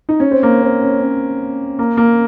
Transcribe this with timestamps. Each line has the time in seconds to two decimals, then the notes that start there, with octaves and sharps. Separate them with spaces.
0.09 D#4
0.20 C#4
0.31 C4
0.43 A#3
0.62 C4
0.82 C#4
1.01 C#4
1.79 A#3
1.97 A#3